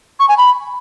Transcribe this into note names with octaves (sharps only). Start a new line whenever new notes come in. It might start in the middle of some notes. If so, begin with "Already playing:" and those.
C#6
G#5
B5